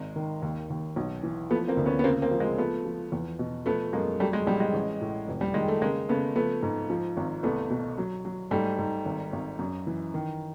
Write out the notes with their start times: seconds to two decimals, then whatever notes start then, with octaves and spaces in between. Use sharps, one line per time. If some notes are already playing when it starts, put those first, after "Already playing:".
Already playing: G#1 G#3
0.16 D#3
0.42 D#2
0.70 D#2
0.96 B1
1.23 E3
1.50 F3 A3 B3
1.68 A#3 C4
1.77 D2
1.86 B3 C#4
1.99 B3
2.04 C#3 A#3 C4
2.22 A#3 C4
2.31 F3
2.40 G#3 A#3
2.58 F3 A3 B3
2.85 F3
3.12 E2
3.39 B2
3.66 F3 A3 B3
3.93 F#2 G#3 A#3
4.20 F#3 G3 A3
4.33 G#3
4.47 A#1 G3
4.60 G#3
4.74 A1
5.01 A2
5.28 F1
5.41 G3
5.54 D#3 G#3
5.68 A3
5.81 C#3 G#3 A#3
6.09 C#3 A3 B3
6.36 F3 A3 B3
6.63 G#2
6.90 F3
7.17 G#1
7.43 C2 A3 B3
7.70 B2
7.98 F#3
8.25 F#3
8.51 G#2 G3 A3
8.78 G#2
9.05 G#1
9.32 G#1
9.59 F#2
9.87 E3
10.14 D#3